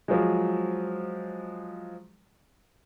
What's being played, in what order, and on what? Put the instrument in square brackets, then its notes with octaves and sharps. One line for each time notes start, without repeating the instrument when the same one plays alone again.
[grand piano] F3 F#3 G#3